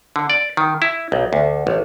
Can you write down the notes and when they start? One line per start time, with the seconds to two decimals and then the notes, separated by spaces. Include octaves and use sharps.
0.16 D3
0.30 D5
0.57 D#3
0.82 E4
1.12 B1
1.33 D2
1.67 A1